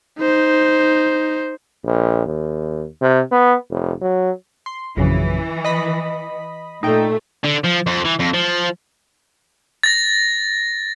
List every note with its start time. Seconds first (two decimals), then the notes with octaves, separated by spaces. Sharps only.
0.19 D#4 C5
1.85 A#1
2.26 D#2
3.01 C3
3.31 B3
3.70 F1
4.01 F#3
4.66 C6
4.97 A#1 F#2 C#3 E3
5.65 D#5 B5
6.83 A#2 A3 D#4 G5
7.44 D3
7.64 F3
7.87 F2
8.05 E3
8.19 F2
8.34 F3
9.83 A6 A#6